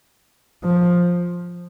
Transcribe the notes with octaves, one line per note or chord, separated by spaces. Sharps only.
F3